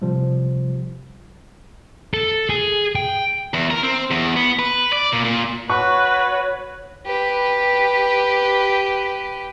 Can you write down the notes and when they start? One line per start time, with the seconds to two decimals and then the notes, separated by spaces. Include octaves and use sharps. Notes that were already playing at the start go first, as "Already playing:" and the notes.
0.02 C3 F3 G3
2.14 A4
2.49 G#4
2.95 G5
3.54 E2
3.71 A#4
3.83 C4
4.11 E2
4.36 B3
4.59 B4
4.93 D5
5.12 A#2
5.25 A#2
5.70 F#4 B4 C#5 C#6
7.06 G4 B4